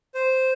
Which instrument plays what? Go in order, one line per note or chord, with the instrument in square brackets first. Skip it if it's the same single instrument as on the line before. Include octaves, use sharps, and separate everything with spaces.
[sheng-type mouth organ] C5